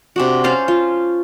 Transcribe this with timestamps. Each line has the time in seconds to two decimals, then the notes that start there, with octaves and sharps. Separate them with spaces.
0.16 C3 D4 F#4
0.44 C#4 C5 F5 A5
0.68 F4